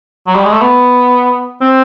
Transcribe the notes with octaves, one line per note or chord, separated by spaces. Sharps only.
F#3
G3
G#3
A3
B3
C4